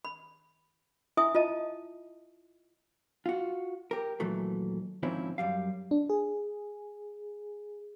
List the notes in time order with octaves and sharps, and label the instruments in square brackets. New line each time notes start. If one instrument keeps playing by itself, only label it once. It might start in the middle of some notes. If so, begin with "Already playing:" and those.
[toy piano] B5
E4 E5 G#5 D#6
F4 D#5 A5
[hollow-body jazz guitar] F4 F#4
G4 A#4
D#2 A#2 E3 F#3 A3
G#2 D#3 F3 C4 C#4 E4
F#2 G3 F5
[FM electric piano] D4
G#4